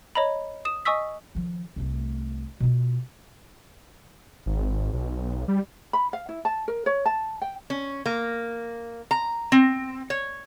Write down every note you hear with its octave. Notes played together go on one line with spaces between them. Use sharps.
C#5 D#5 A#5 B5
D#6 E7
D#5 G#5 C#6 D#6 E6 B6
D#3 F3
C2 A3
B2 F4
G#1
B1
G3
B5
F5
E4
A5
A#4
C#5
A5
G5
C#4
A#3
A#5
C4
C#5